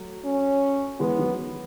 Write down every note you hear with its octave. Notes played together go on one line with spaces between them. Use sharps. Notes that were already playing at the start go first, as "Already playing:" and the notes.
Already playing: F#3 A3
C#4
E3 G#3 B3
D#3 F#3